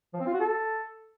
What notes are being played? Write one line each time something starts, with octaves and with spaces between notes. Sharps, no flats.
F3
C4
F4
F#4
A4